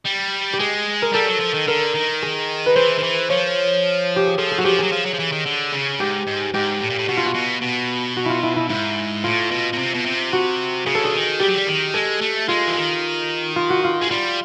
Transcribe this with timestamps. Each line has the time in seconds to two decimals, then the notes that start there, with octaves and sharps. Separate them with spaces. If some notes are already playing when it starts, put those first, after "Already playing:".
0.06 G3
0.53 G4
0.59 G#3 G#4
1.02 A#4
1.13 G3 A4
1.27 F#3
1.40 F3
1.54 D#3
1.68 D3 A#4
1.95 D#3
2.22 G#4
2.66 B4
2.76 E3 C5
2.98 D#3
3.03 E3
3.30 F3 C#5
4.16 G4
4.27 G#4
4.38 F3 A4
4.51 G#4
4.58 F#3 F#4
4.64 F3 G4
4.79 F#3 G#4
4.92 F3
5.06 F#3
5.14 F3
5.19 E3
5.32 D#3
5.46 D3
5.73 C#3
6.00 G#2 G4
6.27 G#2
6.54 G#2 G4
6.81 A2
6.90 A#2
6.98 A2
7.08 B2 F#4
7.17 F4
7.25 F#4
7.35 B2
7.62 B2
8.17 F#4
8.25 E4 F4
8.43 E4
8.56 E4
8.70 G#2 E4
9.24 A2 F4
9.51 B2
9.73 B2
9.78 C3
9.94 B2
10.05 C3
10.33 F#4
10.86 C#3 G#4
10.95 A4
11.03 D3 G#4
11.14 D#3
11.40 G3 G4
11.48 F#3
11.56 G3
11.67 D#3
11.94 G#3 A4
12.21 A3
12.48 G#3 F4
12.67 E3
12.75 D#3
13.56 F4
13.70 F#4
13.84 F4
14.01 G#3
14.10 G3 F4